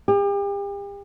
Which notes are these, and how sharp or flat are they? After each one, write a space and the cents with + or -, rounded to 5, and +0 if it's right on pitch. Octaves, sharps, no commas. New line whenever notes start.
G4 +40